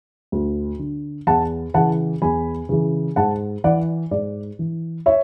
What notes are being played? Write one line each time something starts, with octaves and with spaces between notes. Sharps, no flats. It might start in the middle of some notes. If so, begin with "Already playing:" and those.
D2
D3
E2 F#5 A5
C#3 E3 F#5 A5
E2 G#5 B5
C#3 E3
G#2 F#5 A5
E3 D5 F#5
G#2 D5
E3
C#5 E5